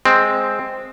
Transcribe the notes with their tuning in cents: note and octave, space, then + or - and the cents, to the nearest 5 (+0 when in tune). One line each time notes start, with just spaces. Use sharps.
G#3 +0 C4 +0